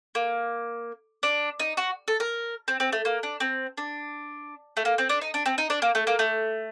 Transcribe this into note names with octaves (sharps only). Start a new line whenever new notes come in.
A#3
D4
D#4
F#4
A4
A#4
C4
C4
A3
A#3
D4
C4
D4
A3
A#3
C4
D4
D#4
D4
C4
D#4
D4
A#3
A3
A#3
A3